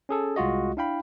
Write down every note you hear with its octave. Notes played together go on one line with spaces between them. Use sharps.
C#4 G#4 A4
C2 G#3 F4 F#4 D#5
D4 E4 F5 G5 B5